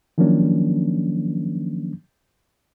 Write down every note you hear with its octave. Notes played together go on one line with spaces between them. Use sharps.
D#3 F3 F#3 A#3 C#4 D4